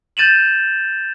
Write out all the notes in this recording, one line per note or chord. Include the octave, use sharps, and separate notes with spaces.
G6 A6 D#7 E7 F#7